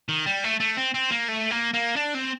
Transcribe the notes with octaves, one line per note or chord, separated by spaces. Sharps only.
D#3
G3
A3
A3
C4
C4
A#3
A3
A#3
A#3
D4
C4